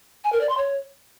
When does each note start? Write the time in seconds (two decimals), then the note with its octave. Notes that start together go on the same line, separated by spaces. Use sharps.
0.24 G#5
0.33 A#4
0.41 D5
0.49 C6
0.58 C#5